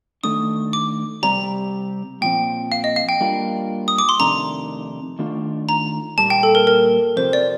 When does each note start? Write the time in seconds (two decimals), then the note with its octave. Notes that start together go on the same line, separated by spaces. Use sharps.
0.24 D#3 A3 D4 D#6
0.73 D6
1.23 C3 G3 C4 G4 D5 A#5
2.21 A#2 F3 C4 G5
2.72 F5
2.84 D#5
2.96 F5
3.09 G5
3.21 G3 A#3 D4 F4 A#4
3.88 D#6
3.99 D6
4.09 C6
4.19 F2 C3 D#3 A3 D4 A#5
5.19 D#3 A3 D4 F4
5.69 A#5
6.18 A#2 G3 A#3 A5
6.30 G5
6.43 A4
6.55 A#4
6.67 A#4
7.17 F2 C3 F3 C4 C5
7.33 D5